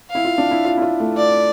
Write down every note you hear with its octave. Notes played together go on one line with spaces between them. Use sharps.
E4 F5
F4
D4
E4
F4
E4
F4
A3
D5